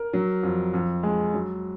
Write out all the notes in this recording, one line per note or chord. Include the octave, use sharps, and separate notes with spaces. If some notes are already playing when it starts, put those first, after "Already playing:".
Already playing: A#4
F#3
F2
F2
G#3
F#3